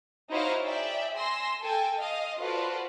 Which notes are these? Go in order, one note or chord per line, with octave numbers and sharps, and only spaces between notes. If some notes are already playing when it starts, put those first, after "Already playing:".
D#4 E4 F#4 C5 C#5 F5
G#4 D5 E5 G5
G#5 C6 E6 A#6
A4 G5 G#5
D#5 F5
F4 F#4 A4 B4 C5 D5